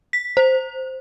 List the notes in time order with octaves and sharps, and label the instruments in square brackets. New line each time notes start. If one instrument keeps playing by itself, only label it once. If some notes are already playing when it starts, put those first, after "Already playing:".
[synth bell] B6
C5